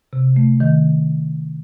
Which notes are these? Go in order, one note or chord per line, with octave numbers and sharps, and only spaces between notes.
C3
A3
D#3